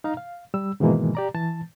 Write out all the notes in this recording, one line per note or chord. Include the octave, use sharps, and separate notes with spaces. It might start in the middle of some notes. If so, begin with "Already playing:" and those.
D#4 F5 A#5
F5
G3 E6
G#2 B2 D#3 E3 G#3 A#3
G4 D5 A#5
E3 A5 A6